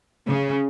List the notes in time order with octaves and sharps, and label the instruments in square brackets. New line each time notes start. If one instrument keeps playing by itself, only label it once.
[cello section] C#3